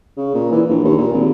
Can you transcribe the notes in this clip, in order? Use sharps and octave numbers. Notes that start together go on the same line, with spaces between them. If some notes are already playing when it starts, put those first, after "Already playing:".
C#3
A#2
E3
A#1
D#2
A#2
G#1